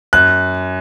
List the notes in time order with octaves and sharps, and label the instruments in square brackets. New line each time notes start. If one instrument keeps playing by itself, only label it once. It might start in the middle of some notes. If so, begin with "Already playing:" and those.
[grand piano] F#2 F#6